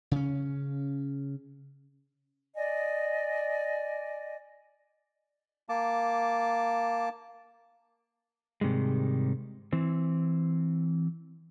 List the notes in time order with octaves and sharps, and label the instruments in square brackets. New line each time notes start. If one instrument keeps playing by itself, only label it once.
[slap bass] C#3 C#4
[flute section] D5 D#5 G#5
[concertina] A#3 A5 D6
[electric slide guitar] G#2 C3 D#3 G3 G#3
E3 C4